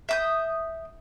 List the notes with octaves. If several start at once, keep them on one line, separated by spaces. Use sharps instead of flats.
E5 D#6 G6